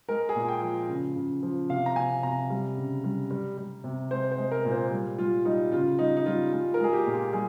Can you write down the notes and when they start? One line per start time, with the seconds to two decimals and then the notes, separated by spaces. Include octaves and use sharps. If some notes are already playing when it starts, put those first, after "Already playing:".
0.08 G#3 A#4
0.29 G#4
0.36 A#2
0.48 G5
0.62 F3
0.89 C#3
1.16 C#3
1.43 F3
1.69 C3 F5
1.86 A#5
1.96 C3 G#5
2.23 C3 A#5
2.50 G3
2.77 C#3
3.04 G3
3.31 G3
3.58 G3
3.84 C3
4.11 G#3 C5
4.32 C5
4.38 G#3
4.51 A#4
4.65 A#2
4.72 C5
4.91 G3
5.18 G3 F4
5.45 G3 D#4
5.72 C#3 F4
5.99 G3 D#4
6.17 D#4
6.26 G3 F4
6.52 G#3 F4
6.74 A#4
6.79 G#3 G#4
6.93 G4
7.06 A#2
7.33 G3 G#4